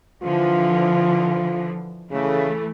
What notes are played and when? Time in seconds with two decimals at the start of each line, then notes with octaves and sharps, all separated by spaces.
0.23 D3 E3 F3 F4
2.11 C#3 E3 A3